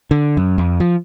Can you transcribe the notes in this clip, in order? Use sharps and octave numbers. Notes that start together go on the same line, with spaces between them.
D3
F#2
F2
F3